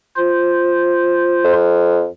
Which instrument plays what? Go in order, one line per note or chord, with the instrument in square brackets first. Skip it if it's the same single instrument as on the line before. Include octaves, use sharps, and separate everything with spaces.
[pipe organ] F4 C5
[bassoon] F2